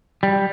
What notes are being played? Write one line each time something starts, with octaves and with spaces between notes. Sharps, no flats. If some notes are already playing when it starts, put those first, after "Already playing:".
G3